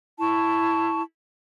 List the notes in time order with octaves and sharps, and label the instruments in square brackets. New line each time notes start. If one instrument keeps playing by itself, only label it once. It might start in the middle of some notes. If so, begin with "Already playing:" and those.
[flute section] E4 A5 C#6